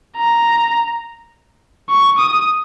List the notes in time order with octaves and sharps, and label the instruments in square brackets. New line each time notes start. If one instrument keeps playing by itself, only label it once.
[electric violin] A#5
C#6
D#6